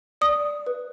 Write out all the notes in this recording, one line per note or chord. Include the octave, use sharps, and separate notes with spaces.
D5 D#6
B4